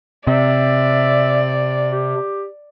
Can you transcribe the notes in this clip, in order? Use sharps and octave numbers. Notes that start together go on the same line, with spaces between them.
C3 D5 E5
G4